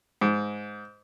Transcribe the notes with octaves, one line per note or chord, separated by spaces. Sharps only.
G#2